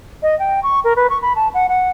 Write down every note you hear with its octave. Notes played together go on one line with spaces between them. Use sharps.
D#5
G5
C#6
A#4
B4
C#6
B5
A5
F#5
F#5